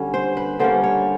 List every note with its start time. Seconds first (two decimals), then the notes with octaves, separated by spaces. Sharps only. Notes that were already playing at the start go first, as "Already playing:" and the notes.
Already playing: D3 G3 C#4
0.14 C5
0.37 B4
0.59 D3 G3 A#3 C#4 C5
0.84 C#5